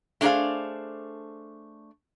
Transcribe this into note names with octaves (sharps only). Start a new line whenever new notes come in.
A3 D4 G#4 A4 C5 F5